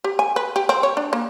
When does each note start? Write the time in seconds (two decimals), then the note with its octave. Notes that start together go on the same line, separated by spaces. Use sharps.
0.04 G4
0.19 G#5
0.36 B4
0.56 G4
0.69 C4
0.83 C#5
0.97 D4
1.13 A#3